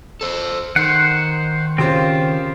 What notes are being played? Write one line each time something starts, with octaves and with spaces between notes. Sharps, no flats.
A4 C5
D#3 C5 F#5 C7
C#3 C4 F4 G4 C5